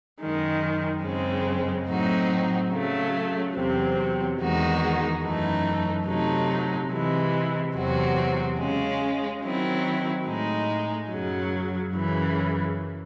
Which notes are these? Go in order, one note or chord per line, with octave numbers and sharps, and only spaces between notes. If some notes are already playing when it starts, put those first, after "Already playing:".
F#2 D#3 G#3
F#2 C#3 G#3 C4
A2 F#3 C4 D#4 F#4
C#3 F#3 A3
E2 C3 F#3 C4
E2 D#3 G#3 D#4 F#4
F#2 E3 A3 D#4
C3 F#3 A3 D#4
C3 E3 G#3
E2 C3 F#3 C4 F#4
C#3 G#3 C#4
D#3 F#3 C4 E4
A2 G#3 D#4
F#2 C#3 F#3
F#2 C#3 E3